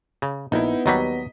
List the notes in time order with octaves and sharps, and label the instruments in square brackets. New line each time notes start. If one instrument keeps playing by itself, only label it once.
[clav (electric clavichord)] C#3
[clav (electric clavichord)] A#1 [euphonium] B3 [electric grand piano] D#4 E4
[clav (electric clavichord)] D#2 F#3 G3 [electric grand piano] D#5 B6